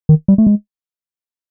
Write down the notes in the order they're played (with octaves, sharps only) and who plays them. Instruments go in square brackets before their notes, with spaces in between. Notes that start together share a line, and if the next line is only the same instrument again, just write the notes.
[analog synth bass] D#3
G3
A3
G#3